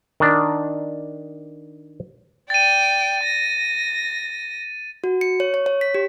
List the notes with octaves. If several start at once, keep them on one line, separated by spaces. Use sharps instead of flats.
D#3 D4
D5 G5 A6 D#7
A#6
F#4
C#7
C#5
C#5
C#5
B6
G4